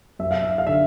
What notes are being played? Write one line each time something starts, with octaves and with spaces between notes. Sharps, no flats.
F#2 E5
F5
E5
F5
D3 E5